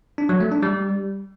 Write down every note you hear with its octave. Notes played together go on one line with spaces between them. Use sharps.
D4
F#3
A3
D4
G3